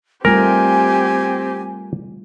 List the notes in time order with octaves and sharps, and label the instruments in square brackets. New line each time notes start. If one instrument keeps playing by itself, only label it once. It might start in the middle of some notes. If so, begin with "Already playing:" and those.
[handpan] G3 A3 F4 [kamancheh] C4 G4 [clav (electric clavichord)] A#4 [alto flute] G#5